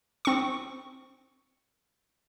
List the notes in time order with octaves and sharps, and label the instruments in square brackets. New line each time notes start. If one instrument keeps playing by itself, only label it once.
[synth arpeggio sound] C4 C#6